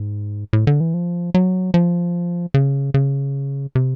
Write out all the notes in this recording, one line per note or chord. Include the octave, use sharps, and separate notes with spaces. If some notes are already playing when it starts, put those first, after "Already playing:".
Already playing: G#2
A2
D3
E3
F3
F#3
F3
C#3
C#3
C3